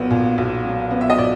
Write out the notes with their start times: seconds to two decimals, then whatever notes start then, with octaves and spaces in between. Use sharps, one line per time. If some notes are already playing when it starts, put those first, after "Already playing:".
Already playing: B1 A#2 F#3 B3
0.10 A#2
0.38 B1
0.65 F#3
0.91 B3
1.01 E5
1.10 D#5
1.18 A#2 D5